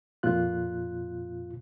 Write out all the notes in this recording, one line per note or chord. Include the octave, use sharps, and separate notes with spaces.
F2 A#2 F4 F#6